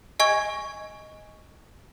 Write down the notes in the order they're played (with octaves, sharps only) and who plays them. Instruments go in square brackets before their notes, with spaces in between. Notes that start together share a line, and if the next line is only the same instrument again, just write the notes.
[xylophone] D#5 G#5 C#6 G#6